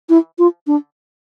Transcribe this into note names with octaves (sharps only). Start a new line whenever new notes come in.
E4
F4
D4